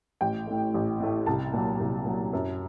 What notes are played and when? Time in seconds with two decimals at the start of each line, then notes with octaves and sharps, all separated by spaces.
0.21 A1 G5
0.47 A2 A3
0.74 A1
1.00 A2 A3
1.26 C2 A5
1.53 A#2 F#3
1.80 C2
2.06 A#2 F#3
2.33 F#2